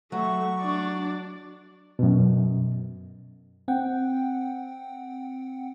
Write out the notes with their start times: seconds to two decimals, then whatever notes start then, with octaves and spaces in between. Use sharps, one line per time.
0.12 F#3 A3 C#6
0.61 D4 D5
1.99 F#2 B2
3.68 C4 F#5 G5